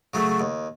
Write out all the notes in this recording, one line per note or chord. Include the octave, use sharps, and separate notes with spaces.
C#3 F#3 A3
D#2